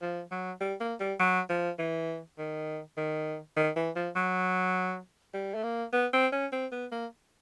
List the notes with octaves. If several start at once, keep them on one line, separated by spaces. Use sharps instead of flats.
F3
F#3
G3
A#3
G3
F#3
F3
E3
D#3
D#3
D#3
E3
F3
F#3
G3
A3
A#3
B3
C4
C#4
C4
B3
A#3